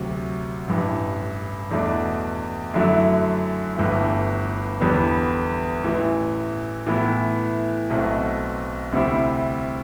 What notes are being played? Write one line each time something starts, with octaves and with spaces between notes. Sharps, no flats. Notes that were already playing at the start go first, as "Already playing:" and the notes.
Already playing: D2 C3 F#3
A1 G2 E3
E2 B2 A3 D4
F#2 D3 F#3 A3 E4
G1 G2 E3 A3
E2 D3 G3 B3
A1 A2 E3
A2 E3 B3 E4
B1 B2 A3 C4
D2 C3 G3 C4 E4